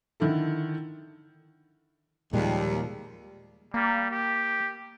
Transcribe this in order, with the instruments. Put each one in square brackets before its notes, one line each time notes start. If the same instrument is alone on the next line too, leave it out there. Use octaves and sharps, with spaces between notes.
[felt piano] D3 D#3 E4 A4
[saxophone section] D#2 [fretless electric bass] A#2 [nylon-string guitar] F3 G#3 [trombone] G3
[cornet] G3 [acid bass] A#3
[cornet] G4